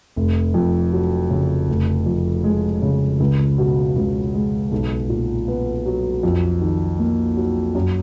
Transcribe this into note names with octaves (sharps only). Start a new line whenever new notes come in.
F1
F2
F#3
C#3
F1
F2
G#3
C#3
C#2
B2
C#2
G#3
B1
A#2
B3
F#3
F2
D#3
A#3
F#3
F#2